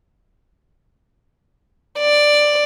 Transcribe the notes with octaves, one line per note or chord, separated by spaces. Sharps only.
D5